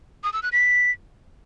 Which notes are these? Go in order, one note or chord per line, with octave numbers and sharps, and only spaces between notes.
D#6
E6
F#6
B6